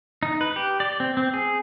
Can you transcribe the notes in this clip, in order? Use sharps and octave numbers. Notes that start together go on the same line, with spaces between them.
D#4
B4
G4
D5
C4
C4
G#4